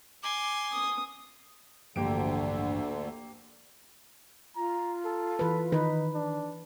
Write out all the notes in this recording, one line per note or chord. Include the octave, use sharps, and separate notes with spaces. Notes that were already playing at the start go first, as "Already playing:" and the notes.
G#5 C6 D6
D#6
A1 D2 G2 D3 F3 A#3 G4 D7
F4 A#5
A4
E3 B4
D#3 D#4 B4
D4